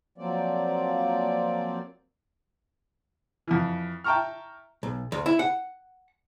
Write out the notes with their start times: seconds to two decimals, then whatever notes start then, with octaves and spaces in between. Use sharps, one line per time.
0.18 F3 F#3 A#3 C4 D5
3.47 F2 E3
4.04 E5 G5 A5 A#5 C#6 F6
4.83 B1
5.12 D2
5.26 E4
5.39 F#5